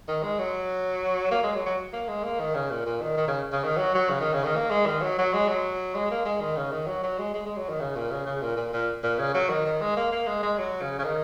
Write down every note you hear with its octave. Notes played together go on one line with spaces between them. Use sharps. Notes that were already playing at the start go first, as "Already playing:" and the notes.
D#3
G#3
F#3
A#3
G#3
F#3
F#3
A#3
G#3
A#3
D#3
C#3
A#2
A#2
D#3
D#3
C#3
C#3
D#3
F#3
F#3
C#3
D#3
C#3
D#3
A#3
G#3
D#3
F#3
F#3
G#3
F#3
G#3
A#3
G#3
D#3
C#3
D#3
F#3
F#3
G#3
G#3
G#3
F#3
D#3
C#3
A#2
C#3
C#3
A#2
A#2
A#2
A#2
C#3
F#3
D#3
D#3
G#3
A#3
A#3
G#3
G#3
F#3
C#3
C#3
D#3